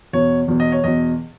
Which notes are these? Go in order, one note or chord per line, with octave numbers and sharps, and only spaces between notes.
E2 B2 C#5
E2 B2
D#5
C#5
E2 B2 D#5